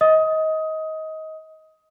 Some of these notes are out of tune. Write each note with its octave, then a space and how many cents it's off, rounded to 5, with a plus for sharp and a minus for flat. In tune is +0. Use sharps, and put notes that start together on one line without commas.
D#5 +25 D#6 +15